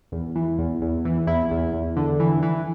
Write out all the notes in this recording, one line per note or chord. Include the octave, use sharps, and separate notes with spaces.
E2
E3
E2
E2
E3
E2 E4
E2
E2
D3
E3
E3